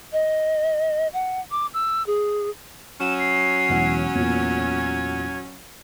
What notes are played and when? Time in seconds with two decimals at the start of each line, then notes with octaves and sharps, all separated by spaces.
0.12 D#5
1.13 F#5
1.51 D6
1.74 E6
2.07 G#4
3.01 F#3 C#4 E7
3.19 C7
3.69 E1 E3 F#5
4.15 E2 A#2 G#6